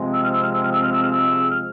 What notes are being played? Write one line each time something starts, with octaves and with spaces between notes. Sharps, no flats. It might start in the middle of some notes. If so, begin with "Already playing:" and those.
Already playing: C3 F3 G#3 C4
E6
F6
E6
F6
E6
F6
E6
F6
E6
F6
E6
F6